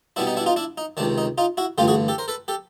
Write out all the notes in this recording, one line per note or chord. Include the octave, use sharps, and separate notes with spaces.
B2 G3 B3 D4 E4
D#4
D4 E4
D#4 F4
D4 E4
D#4
C#2 C3 D#3 D4
D#4
D#4 F4
E4 F#4
A1 G2 D3 F4 G4
F#4 G#4
G4 A4
A#4 C5
A4 B4
G4 A4